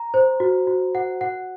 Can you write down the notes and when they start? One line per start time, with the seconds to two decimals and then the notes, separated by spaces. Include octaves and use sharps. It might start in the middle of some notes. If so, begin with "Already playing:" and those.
Already playing: A#5
0.14 C5
0.40 F#4
0.67 F#4
0.95 F#5
1.21 F#5